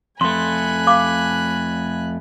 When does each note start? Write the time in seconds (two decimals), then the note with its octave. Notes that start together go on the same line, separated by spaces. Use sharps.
0.21 F2 A3 G#5 B5 C6 F#6
0.87 F5 D6